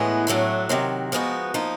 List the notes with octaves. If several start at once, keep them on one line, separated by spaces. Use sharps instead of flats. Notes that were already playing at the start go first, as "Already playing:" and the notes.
Already playing: A2 E3 G#3 B3
A2 F#3 A3 D4
C3 D#3 F#3
F3 G#3 B3 D#4 F#4
F3 A#3 D#4